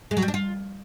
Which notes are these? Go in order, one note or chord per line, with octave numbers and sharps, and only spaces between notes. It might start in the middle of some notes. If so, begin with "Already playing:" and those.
G#3
F#3
G3
D4
F4